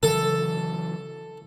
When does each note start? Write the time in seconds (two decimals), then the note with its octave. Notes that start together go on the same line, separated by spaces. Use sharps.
0.03 C#3 E3 F#3 A4